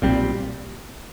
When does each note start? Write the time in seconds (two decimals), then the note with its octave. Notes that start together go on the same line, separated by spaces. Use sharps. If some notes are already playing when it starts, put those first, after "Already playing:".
0.02 B1 A#2 G3 C4